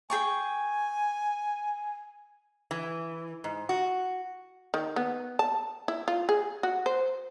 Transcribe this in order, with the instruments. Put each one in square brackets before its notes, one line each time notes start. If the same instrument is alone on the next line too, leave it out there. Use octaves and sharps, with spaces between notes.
[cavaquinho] G#4 G5 C#6 [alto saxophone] G#5
[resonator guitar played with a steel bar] E3
G#2
F#4
[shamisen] D#3
B3
A5
E4
F4
G#4
F#4
C5